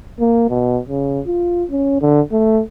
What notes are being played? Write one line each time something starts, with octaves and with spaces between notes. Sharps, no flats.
A#3
B2
C#3
F4
C#4
D3
A3